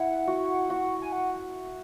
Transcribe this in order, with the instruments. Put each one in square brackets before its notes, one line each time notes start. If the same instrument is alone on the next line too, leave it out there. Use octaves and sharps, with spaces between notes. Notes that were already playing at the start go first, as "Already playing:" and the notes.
Already playing: [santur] E4 [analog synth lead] F#5
[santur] F#4
F#4
[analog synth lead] G#5
F#5